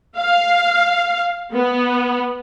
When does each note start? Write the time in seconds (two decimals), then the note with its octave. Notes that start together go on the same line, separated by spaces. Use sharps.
0.17 F5
1.52 B3